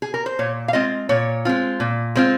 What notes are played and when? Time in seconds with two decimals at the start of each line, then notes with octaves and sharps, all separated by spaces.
0.02 G#4
0.14 A#4
0.26 C5
0.39 A#2 C#5
0.68 F5
0.73 G#3 C4 F4 D#5
1.09 A#2 C#5
1.45 G#3 C4 F4
1.80 A#2
2.15 G#3 C4 F4